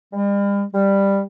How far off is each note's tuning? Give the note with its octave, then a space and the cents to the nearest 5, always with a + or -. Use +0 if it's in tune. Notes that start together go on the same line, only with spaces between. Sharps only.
G3 +40
G3 +10